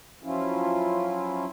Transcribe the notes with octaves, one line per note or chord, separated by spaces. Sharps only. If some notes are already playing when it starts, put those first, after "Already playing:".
F3 F#3 C#4 E4 F4